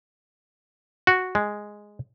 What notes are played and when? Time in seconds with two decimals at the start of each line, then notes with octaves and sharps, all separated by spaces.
1.07 F#4
1.35 G#3